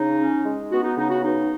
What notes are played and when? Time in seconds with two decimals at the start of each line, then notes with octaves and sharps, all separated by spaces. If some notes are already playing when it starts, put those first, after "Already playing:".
Already playing: C#3 D#4
0.18 C#4
0.45 G#3
0.71 B3 F#4
0.84 D#4
0.96 C#3 D#4
1.09 F#4
1.23 B3 D#4